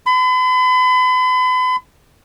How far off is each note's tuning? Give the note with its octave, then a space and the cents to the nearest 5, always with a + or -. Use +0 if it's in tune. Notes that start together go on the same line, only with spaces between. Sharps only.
B5 +40